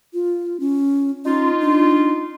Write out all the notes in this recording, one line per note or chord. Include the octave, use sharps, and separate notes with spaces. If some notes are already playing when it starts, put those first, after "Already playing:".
F4
C#4
C#4 D#4 F4
D4